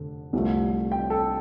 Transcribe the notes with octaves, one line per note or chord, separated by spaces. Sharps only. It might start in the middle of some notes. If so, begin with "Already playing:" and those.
Already playing: F1 D3
C2 C3 F3 A3
G5
A4